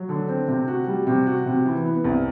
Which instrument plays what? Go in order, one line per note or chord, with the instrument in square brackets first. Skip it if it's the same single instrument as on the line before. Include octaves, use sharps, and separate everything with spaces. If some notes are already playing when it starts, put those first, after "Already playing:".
Already playing: [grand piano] F#3
D3
C4
C3
F#4
G3
C3
F#4
C3
E3
B3
C2